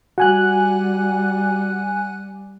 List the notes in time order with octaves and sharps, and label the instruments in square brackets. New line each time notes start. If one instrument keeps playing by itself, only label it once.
[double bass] G3 [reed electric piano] F#4 [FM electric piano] F#5 G#5 F#6